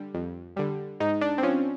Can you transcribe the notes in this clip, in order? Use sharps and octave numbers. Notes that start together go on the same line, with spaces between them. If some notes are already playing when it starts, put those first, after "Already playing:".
Already playing: D3 G3
F2
D3 G3
G#2 D#4
D4
C4
F3 C#4